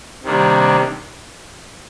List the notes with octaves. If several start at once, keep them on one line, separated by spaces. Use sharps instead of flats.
C3 D#3 G3 A#3 D4